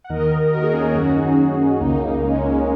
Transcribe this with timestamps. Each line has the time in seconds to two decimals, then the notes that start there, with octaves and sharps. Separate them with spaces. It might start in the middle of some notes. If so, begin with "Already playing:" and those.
0.04 F#5
0.10 D#2 D#3 A#4 D#5
0.53 F#4 A#4
0.62 D#4 G#4
0.73 C#4 F#4
0.84 A#3 D#4
0.95 F#2 D#3 C#4 F#4
1.17 D#4 G#4
1.80 C#2 C#3 A#3 D#4
2.02 A#3 D#4
2.24 G#3 C#4
2.45 G#3